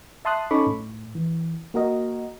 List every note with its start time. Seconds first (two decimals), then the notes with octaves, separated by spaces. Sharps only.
0.25 E5 A5 C6 D#6 F#6
0.51 C#4 D#4 A4 B5 C#6 D6
0.66 A2
1.15 E3
1.74 A#3 F#4 A#4 D#5